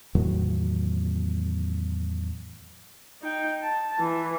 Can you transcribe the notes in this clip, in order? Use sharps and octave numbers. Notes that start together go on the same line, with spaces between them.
E2 A2 D#3 F#3
D#4 G5
A5
E3